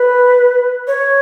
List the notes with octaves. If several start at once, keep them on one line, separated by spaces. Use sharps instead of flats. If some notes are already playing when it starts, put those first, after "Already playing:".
Already playing: B4
C#5